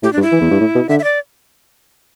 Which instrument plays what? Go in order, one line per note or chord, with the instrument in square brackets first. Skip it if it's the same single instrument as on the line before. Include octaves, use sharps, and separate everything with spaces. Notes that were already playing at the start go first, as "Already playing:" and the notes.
[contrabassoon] A2 [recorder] G4
[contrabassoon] G2 [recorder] D4
[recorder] E4
[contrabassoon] E3
E2
G2
A2
B2
[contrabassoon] D3 [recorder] E5
[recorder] E5
D5